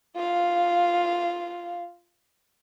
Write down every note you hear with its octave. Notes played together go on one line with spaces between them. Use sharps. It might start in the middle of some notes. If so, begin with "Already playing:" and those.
F4 F5